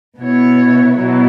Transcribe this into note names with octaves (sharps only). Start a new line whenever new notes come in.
B2 B3 E4 C#5
B2 F#3 E4